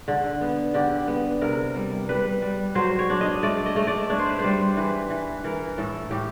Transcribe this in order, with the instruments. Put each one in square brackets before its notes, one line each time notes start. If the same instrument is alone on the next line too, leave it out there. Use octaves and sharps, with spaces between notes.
[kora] D3
B3
D3 G4
B3
C3 A#4
G3
G3 B4
G3
F#3 C5
C#5
D4
D#5
A3 D5
D#5
A3
D5
D4 C#5
C5
B4
C5
G3
E3 B4
E3
E3 A#4
A2 A4
A2 G4